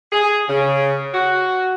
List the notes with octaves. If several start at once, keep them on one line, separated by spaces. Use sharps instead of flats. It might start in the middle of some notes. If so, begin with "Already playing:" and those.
G#4
C#3
F#4